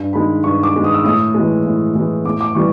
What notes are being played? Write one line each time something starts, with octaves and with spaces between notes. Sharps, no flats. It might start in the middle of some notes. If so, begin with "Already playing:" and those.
Already playing: G2
D#3 G#3 B5
G2 C#6
D6
D#3 G#3
D#6
E6
A2 D#6
E3 G#3
A2
E3 G#3
A2 D6
D6
E3 G3 C#6